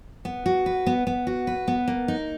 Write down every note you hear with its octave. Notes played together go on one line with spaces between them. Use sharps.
B3
F#4
B4
B3
B3
F#4
B4
B3
A#3
D#4